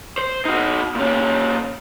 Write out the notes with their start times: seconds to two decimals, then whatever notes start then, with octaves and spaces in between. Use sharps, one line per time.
0.18 C5
0.45 D#4 F#4
0.95 A#2 C#4